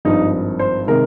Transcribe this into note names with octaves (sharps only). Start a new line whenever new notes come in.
G#1 G2 F3 D#4
C5
C3 D#3 G#3 A#4